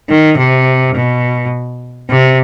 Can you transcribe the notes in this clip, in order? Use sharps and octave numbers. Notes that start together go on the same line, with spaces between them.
D#3
C3
B2
C3